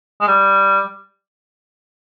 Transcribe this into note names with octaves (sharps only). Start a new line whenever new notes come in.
G#3
G3